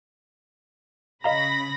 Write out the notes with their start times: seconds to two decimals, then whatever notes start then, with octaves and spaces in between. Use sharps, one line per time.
1.24 C#3 D#5 F5 A#5 B5 A#6